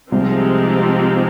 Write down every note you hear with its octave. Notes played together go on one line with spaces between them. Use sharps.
C2 C3 F3 G#3 C4 D#4 G4